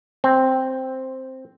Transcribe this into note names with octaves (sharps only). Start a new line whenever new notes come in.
C4